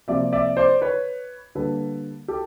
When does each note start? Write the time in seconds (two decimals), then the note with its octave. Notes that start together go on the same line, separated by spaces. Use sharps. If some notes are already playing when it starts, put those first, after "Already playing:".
0.08 C3 F3 A#3 D5 E5
0.33 D5 E5
0.57 C5 D5
0.82 B4 C#5
1.55 D3 G3 A#3 A4 B4
2.28 G4 A4